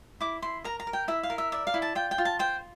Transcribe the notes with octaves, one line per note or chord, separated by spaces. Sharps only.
E4 D6
E4 C6
A#4 A#5
A#5
A#4
G5
E4 E5
F5
A#4
E5
D5 E5
F5
E4
A5
F4 G5
G5
F4
A5
C5 G5